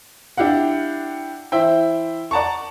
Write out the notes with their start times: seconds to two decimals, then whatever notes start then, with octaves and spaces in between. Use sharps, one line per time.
0.37 D4 E4 G4 F5 F#5
1.52 E3 E4 C5 E5 G5
2.31 D5 F#5 A5 A#5 C#6